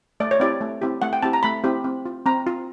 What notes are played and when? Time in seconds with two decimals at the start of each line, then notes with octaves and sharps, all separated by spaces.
0.20 A3 D5
0.31 C#5
0.40 C4 E4 G4 D5
0.61 A3
0.82 C4 E4 G4
1.02 A3 F#5
1.13 G5
1.22 C4 E4 G4 A5
1.33 A#5
1.43 A3 B5
1.64 C4 E4 G4
1.84 C4
2.06 F4
2.26 C4 A#5
2.47 F4